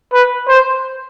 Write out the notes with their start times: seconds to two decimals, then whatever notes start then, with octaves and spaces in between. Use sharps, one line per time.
0.13 B4
0.48 C5